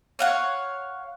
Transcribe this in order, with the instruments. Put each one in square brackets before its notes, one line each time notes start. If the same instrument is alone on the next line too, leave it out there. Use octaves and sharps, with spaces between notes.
[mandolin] C#5 F5 F#5